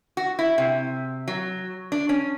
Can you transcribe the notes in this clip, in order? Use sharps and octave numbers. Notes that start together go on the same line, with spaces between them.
F#4
E4
C3
F#3
D4
C#4